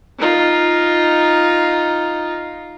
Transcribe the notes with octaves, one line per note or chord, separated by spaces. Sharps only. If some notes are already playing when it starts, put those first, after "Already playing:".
D#4 F4